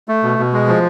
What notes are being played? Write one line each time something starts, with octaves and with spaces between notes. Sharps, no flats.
A3
B2
B2
G#3
F3